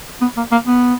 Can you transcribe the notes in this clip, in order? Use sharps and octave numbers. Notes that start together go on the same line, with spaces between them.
B3
A#3
A#3
B3